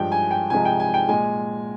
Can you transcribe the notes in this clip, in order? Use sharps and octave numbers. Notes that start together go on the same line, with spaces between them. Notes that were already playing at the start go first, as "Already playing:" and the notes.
Already playing: G2 F3 G#3 G5
G#5
G5
C2 C3 F3 G#3 G#5
G5
G#5
G5
A#2 G#3 G#5